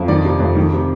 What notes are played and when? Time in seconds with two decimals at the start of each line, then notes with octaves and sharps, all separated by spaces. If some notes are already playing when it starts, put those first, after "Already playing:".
Already playing: F2
0.08 D#3 D5
0.25 C3
0.40 F2
0.57 D#3
0.74 C3